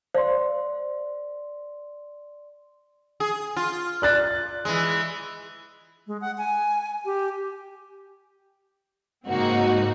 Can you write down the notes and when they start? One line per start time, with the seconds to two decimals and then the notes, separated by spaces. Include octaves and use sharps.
0.14 C5 D5 F5 C6
3.20 G#4
3.57 F4
4.02 D5 F#6 A6
4.65 E3 G#3
6.07 G#3
6.21 F#5
6.38 G#5
7.05 G4
9.29 G#2 C#3 A#3 C4 D#4 F#4